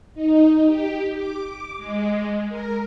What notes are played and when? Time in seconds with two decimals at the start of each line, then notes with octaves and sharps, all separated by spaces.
0.14 D#4
0.63 G4
1.15 D6
1.77 G#3
2.49 A#4